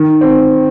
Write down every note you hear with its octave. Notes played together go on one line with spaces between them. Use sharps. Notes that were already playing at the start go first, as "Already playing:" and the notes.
Already playing: D#3
C4